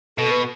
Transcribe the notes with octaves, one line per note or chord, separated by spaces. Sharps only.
B2 A4
B4